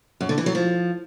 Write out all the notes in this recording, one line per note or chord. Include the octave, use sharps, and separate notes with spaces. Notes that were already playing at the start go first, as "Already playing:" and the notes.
F#2
D3
E3
F#3
F3